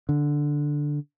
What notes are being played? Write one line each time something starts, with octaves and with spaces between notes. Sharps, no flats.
D3